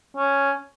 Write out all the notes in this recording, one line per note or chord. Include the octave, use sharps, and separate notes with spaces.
C#4